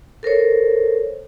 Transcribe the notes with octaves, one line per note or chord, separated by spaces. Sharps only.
A4 A#4 C5 C#5